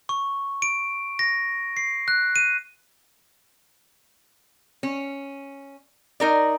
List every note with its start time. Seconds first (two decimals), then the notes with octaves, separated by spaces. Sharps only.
0.09 C#6
0.62 D7
1.19 A#6
1.77 C7
2.08 F#6
2.36 D#7
4.83 C#4
6.20 D#4 A#4 D5